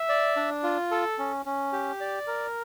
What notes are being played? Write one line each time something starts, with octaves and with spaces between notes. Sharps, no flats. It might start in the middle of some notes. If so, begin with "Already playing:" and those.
Already playing: E5
D5
D4
F4
A4
C#4
C#4
G4
D5
A#4